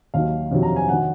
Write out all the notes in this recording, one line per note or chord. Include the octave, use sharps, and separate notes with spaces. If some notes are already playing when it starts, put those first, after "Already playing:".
D#2 D#3 F#3 F5
F2 C3 D#3 F#3
A#5
G#5
D#3 F#3 F#5